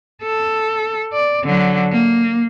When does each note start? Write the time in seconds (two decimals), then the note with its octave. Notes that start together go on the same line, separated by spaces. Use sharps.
0.22 A4
1.12 D5
1.45 D3 F#3
1.91 A#3